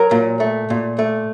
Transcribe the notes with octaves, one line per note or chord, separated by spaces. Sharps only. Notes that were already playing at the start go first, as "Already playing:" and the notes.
Already playing: F#3 A#4
A#2
A3
A#2
A3